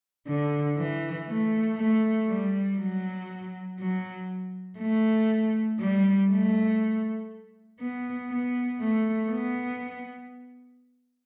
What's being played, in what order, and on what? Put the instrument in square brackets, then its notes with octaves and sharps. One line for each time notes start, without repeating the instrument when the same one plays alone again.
[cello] D3
E3
A3
A3
G3
F#3
F#3
A3
G3
A3
B3
B3
A3
B3